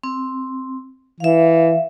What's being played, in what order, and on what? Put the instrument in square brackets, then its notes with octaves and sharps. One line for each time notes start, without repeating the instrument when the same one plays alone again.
[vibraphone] C4
[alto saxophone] E3 [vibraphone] E5 F5